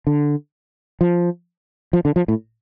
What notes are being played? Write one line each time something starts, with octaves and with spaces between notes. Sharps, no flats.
D3
F3
F3
D3
F3
A2